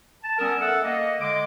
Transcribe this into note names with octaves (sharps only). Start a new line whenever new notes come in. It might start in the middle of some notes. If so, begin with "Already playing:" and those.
A5
G3 B3 C#4 A#4 D#6 E6
A4 A#4 E5 F#5
A#3 D#5
D3 G#3 D#5 D6